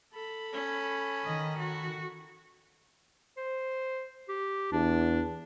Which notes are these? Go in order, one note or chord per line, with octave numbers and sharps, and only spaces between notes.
A4 B5
C#4
D#3 D#5
F#4
C5
G4
E2 D4